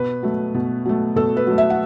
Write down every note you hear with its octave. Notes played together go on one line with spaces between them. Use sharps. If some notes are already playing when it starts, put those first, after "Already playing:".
Already playing: B2 B4
F#3 A3
B2
F#3 A3
B2 A4
B4
F#3 A3
E5
F#5